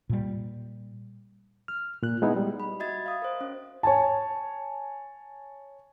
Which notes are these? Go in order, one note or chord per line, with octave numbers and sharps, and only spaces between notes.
A#2 G3
F6
A#2 F#6
G#3 B3 D#4 E4
G3
B5
F#4 D#5 E5 G#6 A6
F5 D#6
A#4 C5
C#4
C#5 G#5 A5